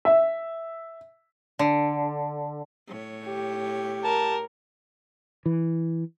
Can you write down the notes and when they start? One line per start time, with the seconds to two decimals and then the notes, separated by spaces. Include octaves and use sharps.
0.05 E5
1.59 D3
2.88 A2 C#5
3.25 G4
4.04 A#4 A5
5.46 E3